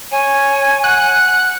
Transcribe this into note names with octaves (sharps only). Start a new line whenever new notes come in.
C#5 G#5
F#5 F#6